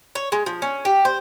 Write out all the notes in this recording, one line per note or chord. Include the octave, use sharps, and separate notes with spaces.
C#5
G#3
F3
C#4
G4
C5